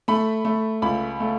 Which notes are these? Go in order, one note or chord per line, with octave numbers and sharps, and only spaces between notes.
A3 B5
A3
C#2 B5
A3